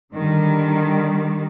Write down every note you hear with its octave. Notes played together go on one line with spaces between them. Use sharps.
D3 D#3 G3